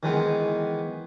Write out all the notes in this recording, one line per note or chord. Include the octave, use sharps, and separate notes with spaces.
D#3 E3 G#3 B3